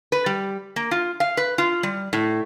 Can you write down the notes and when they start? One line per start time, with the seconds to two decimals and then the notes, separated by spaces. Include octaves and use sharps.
0.12 B4
0.26 G3
0.76 A#3
0.91 F4
1.20 F5
1.37 B4
1.58 F4
1.83 G3
2.13 A2